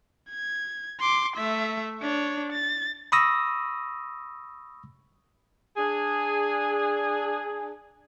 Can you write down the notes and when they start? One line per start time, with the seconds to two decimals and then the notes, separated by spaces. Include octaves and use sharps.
0.30 G#6
1.00 C6 D6
1.37 A3 E5
2.02 D4 C#5
2.53 A6
3.12 B5 C#6 D#6 E6 A#6
5.77 D4 G#4